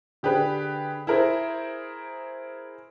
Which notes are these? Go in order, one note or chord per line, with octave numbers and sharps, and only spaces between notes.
D3 G4 G#4 B4
E4 G#4 A#4 C5